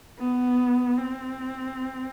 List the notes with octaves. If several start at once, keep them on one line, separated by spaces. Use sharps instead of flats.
B3
C4